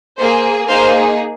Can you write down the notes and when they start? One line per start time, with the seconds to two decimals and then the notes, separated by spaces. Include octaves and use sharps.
0.18 A#3 G#4 C5
0.68 A#3 D#4 G#4 C5 F5